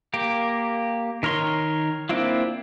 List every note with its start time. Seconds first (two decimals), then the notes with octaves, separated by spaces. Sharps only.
0.14 A#3 G4
1.23 D#3 A#4 C#5 C6
2.09 A#3 C4 D4 E4 F4